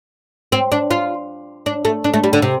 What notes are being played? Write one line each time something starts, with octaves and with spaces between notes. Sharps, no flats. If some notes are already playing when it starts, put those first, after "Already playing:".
C4
D4
F4
D4
A3
D4
A3
G3
D3
C3